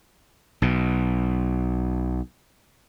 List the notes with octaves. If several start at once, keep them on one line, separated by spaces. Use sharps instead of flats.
B1 B2